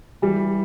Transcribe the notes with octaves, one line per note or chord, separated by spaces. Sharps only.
E3 G3